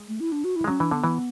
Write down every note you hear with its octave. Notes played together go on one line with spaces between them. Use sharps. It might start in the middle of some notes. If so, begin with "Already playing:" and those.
Already playing: G#3
A3
E4
D4
F#4
E4
G#3
F#3 C#4
E3 D4
D3 B3
E3